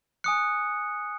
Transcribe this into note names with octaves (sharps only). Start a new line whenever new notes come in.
G#5 D#6 F#6 C#7